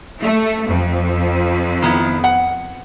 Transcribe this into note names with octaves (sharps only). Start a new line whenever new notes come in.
A3
F2
D#3 B3 E4
F#5